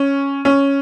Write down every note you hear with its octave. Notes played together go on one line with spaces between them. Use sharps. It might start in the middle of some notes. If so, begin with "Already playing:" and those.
Already playing: C#4
C#4